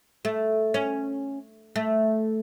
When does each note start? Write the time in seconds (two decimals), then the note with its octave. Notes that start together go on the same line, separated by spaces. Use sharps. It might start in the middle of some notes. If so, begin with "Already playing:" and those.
0.25 A3
0.74 C#4
1.76 A3